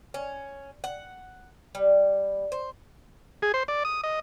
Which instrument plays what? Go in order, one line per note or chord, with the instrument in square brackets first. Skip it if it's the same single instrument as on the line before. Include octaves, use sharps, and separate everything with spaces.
[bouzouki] C#4
F#5
G3
C5
[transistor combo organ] G#4
C5
D5
D#6
D#5